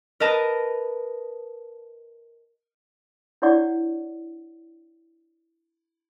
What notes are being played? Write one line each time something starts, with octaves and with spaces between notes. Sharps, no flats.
A#4 B4 D#5 A5 A#5 A#6
D4 E4 C#5 D5 F#5 C#6